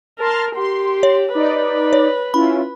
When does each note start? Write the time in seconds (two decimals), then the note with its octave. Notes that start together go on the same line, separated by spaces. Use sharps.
0.19 A#4 A5 C6 F6
0.55 G4 C6
1.03 C#5
1.34 D#4 B4 D5
1.93 C#5
2.34 C#4 E4 F4 B5